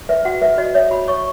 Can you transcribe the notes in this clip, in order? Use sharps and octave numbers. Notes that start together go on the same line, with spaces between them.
B4 E5
F#4 F#5
B4 E5
F#4 D#5
C#5 E5
F#4 B5
C#5 C#6